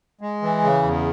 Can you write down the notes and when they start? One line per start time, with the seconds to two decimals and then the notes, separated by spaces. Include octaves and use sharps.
0.21 G#3
0.42 E3
0.63 C#3
0.83 E2